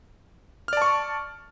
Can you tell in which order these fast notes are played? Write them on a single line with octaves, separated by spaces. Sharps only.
F6 D5 A5 C#6